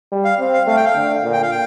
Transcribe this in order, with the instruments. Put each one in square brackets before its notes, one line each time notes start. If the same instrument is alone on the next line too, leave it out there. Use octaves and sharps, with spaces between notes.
[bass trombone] G3
[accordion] F5
[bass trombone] C4
[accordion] F5
[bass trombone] A3 [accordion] F5
[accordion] G5
F5
[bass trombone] D3
A#2
[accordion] G5
F5
G5